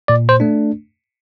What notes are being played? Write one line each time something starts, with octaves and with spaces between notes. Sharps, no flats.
A#2 D5
C5
A3 D4